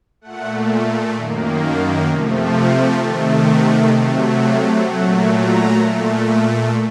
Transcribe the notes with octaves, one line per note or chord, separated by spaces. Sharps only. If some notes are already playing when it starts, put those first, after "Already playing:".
A#2 A3 F#5
F#2 D#3 A#3
A5
C3 F3 A3
A#5
C3 D#3 A3 A5
F#5
C3 F#3 A3 F5
F5
A#2 F#3 A3 F#5
A#5
A#2 A3